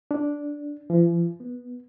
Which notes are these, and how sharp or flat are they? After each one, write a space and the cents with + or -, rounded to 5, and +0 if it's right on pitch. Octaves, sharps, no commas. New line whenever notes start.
D4 -5
F3 -45
B3 -10